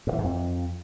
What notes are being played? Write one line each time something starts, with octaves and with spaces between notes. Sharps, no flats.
G2
E3
G#2
F2